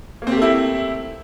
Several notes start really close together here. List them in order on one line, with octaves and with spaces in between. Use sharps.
A#3 C4 G4 A3 E4